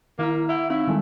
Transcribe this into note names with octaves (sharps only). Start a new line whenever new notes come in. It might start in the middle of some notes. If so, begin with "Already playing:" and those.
D#3 A#3 E4 A#5
E4 E5 F#5
C4 D#4 E4 F5
D#3 G3 G#3